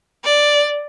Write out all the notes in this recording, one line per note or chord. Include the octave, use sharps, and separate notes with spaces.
D5